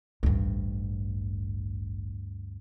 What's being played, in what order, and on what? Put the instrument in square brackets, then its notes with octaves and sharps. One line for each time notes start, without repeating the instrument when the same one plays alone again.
[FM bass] A1 [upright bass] D2 G2